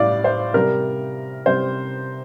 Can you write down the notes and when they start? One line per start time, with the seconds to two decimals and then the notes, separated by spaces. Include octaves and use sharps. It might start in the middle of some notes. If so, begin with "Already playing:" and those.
Already playing: A2 G3 D5 F5
0.24 C5
0.54 C3 G3 A#4
1.46 C3 G3 C5